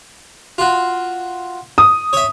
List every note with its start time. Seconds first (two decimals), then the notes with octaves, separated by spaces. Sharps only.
0.58 F4 F#4
1.78 D#6
2.13 C#5 E5